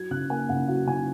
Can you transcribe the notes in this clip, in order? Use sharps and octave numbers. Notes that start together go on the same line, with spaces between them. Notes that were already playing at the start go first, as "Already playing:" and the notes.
Already playing: F#3 G#6
C#3 F#6
A#3 G#5
C#3 F#5
F#3 F#5
C#3 G#5